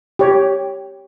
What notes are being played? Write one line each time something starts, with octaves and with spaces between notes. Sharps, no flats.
G4 C#5